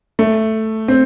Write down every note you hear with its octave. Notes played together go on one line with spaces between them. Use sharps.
A3
C4